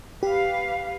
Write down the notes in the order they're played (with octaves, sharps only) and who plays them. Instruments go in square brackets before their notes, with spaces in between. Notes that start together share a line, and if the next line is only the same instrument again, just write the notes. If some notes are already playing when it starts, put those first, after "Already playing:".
[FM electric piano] G4 [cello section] B4 F5